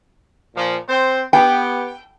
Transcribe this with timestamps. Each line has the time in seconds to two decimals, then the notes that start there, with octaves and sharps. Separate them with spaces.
0.55 A#2 F3
0.89 C4 C5
1.33 B3 G4 G5